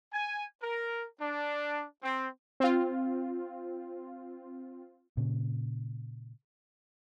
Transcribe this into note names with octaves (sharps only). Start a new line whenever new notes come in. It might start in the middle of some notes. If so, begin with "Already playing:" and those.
G#5
A#4
D4
C4
C4 F4
A#2 C#3